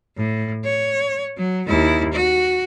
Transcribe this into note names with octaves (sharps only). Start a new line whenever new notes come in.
A2
C#5
F#3
D#2 E4
F#4